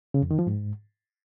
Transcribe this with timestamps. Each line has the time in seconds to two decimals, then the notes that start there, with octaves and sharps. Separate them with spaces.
0.14 C#3
0.22 F2
0.31 D#3
0.39 F3
0.47 G#2